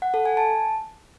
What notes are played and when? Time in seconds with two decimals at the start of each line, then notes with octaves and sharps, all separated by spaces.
0.02 F#5
0.14 A4
0.25 G#5
0.37 A5